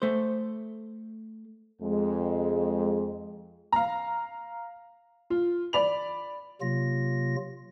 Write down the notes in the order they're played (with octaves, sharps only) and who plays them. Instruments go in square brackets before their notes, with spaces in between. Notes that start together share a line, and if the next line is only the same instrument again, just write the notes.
[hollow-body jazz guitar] A3 C5
[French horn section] F2 G#3
[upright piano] F5 A#5
F4
D5 B5 F7
[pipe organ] C3 F#3 A#3 F4 A#6